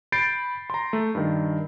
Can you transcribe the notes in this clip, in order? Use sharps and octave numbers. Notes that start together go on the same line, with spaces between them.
B5 G6 A6 C7 D7
A#5 C6
A3
G2 D#3